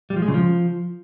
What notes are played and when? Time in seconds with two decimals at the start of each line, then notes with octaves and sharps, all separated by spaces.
0.10 G3
0.16 F3
0.22 G#3
0.28 C#3
0.34 F3